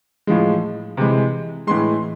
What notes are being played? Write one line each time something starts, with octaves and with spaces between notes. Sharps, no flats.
A2 F3 G#3
C3 E3 G#3
A2 E3 G#3 C6